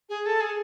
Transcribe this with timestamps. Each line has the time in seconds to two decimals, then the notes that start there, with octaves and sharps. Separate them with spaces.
0.09 G#4
0.25 A4
0.41 G#4